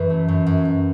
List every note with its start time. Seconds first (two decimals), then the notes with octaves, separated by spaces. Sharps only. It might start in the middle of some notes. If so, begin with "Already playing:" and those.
Already playing: F#2 E3 B4
0.10 A3
0.28 F#2
0.46 F#2
0.65 F#2